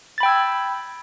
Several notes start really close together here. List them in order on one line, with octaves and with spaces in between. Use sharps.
A6 B5 G5 E6 G#6